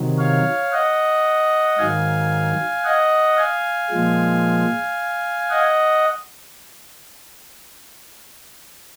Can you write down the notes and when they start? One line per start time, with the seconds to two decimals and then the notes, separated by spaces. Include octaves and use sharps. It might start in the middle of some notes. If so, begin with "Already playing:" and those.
Already playing: C3 D#3 F#3
0.19 C#5 F5
0.72 D#5 F#5
1.79 G#2 D#3 F#3 F5 G#5
2.84 D#5 F#5
3.37 F5 G#5
3.91 A#2 F3 G#3
5.50 D#5 F#5